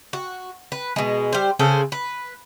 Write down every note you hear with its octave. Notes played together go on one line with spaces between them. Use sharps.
F#4
B4
B2 G#3
G3 C5
C#3 G#4 A4 C5
B4